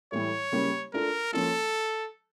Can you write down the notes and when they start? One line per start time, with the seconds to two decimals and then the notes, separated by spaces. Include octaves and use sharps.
0.12 A2 E3 G3 C#5
0.52 C#3 G3 A#3 C#4 G4
0.93 A3 D4 F4 A4 A#4
1.33 F3 A#3 C#4 F4 A4